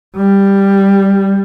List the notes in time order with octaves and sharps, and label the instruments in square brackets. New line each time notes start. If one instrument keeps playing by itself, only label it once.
[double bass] G3